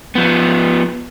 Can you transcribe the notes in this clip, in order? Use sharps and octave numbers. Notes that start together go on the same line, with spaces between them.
F3 B3